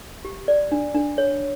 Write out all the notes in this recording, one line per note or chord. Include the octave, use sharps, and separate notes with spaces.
G4
D5
D4
D4
C#5